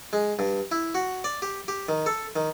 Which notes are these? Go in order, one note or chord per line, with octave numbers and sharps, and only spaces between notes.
G#3
G2
E4
F#4
D5
G4
G4
D#3
A4
D#3